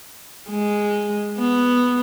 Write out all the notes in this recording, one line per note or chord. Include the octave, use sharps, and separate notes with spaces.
G#3
B3